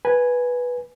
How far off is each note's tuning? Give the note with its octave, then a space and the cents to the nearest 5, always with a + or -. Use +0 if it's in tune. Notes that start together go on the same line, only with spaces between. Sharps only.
B4 -10 G#5 +0